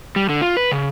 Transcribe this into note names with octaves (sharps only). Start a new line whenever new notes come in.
G3
D3
F4
B4
C#3